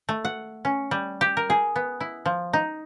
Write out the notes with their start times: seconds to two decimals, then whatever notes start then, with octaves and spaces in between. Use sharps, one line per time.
0.09 A3
0.25 F#5
0.65 C#4
0.91 G3
1.21 G4
1.37 A#4
1.50 G#4
1.76 B3
2.01 E4
2.26 F3
2.53 D#4